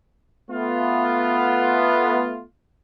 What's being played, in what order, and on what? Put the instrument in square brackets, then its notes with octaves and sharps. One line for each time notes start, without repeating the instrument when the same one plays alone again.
[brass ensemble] A3 B3 F4